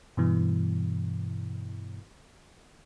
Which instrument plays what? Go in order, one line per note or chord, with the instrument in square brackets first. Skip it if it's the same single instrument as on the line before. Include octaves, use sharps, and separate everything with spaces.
[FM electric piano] G2 B2 E3